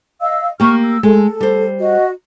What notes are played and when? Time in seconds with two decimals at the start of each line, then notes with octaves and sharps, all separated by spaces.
0.21 D#5 F5 E6
0.60 A#3 G4 C#6 F6
0.83 E6
1.03 G#3 A4
1.40 G3 C5
1.79 F#4 D#5